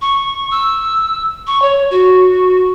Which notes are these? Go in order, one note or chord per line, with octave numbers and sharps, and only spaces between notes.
C#6
E6
C#6
C#5
F#4